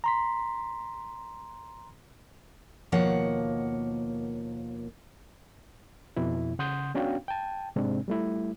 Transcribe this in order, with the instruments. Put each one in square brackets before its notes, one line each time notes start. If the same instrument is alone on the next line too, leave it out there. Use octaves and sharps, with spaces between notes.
[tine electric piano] A#5 C6 B6
[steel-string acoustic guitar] D#2 B2 F3 A#3 C#5 F#5
[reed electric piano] F2 B2 E4
C#3 F#5 C6 D#6 G6
B3 C#4 D4 F#4 F5 G5
G5 A5
G#2 C3 G#3 C4 D4
G3 A3 E4